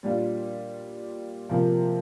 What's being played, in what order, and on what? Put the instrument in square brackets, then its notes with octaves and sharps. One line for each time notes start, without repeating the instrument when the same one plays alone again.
[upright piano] A#2 G3 D4 F4
C3 F3 A#3 F4